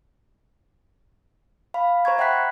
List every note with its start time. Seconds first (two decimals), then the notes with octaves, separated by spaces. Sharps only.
1.74 F5 B5
2.05 C5 A#5 C#6 G#6
2.18 E5 F#5 G5 B5 F#6 B6